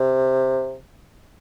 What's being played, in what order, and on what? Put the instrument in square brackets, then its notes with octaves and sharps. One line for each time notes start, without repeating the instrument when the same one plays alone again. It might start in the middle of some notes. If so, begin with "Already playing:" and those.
Already playing: [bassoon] C3